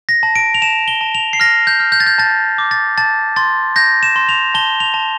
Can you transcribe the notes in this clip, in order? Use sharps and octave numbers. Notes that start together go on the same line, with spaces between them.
A#6
A5
D7
F7
A5 E7
G7
A5
F7
C7
F6 A#6
G6
F6
G6
A6
G6
A5 A6
D6
A6
A5 A6
C6 A6
G6 A#6
E7
C6
F7
A5 G7
F7
A5